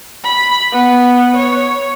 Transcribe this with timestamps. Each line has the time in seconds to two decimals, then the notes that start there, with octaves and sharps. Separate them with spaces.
0.24 B5
0.72 B3
1.37 C#5